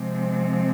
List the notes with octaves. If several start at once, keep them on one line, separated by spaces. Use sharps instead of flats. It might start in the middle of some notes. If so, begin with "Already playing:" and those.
Already playing: C3 F3 G#3 C4